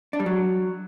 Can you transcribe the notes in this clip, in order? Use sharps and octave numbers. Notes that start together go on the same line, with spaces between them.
D4
G3
F#3